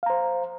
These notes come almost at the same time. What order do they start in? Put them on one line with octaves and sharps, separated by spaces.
F5 A#5 C5